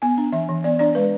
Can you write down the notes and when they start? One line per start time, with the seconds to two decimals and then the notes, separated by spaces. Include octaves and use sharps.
0.02 B3 G#5
0.18 D4
0.33 E3 E5
0.49 E3
0.64 B3 D5
0.79 D4 D5
0.95 G#3 B4